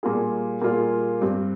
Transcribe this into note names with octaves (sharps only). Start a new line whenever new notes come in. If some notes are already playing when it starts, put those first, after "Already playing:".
A#2 G3 A#3 F4 G#4
A#2 G3 A#3 F4 G#4
G2 G3 C4